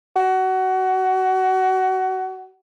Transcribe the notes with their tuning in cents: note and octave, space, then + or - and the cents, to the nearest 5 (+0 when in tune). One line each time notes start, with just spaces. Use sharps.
F#4 +25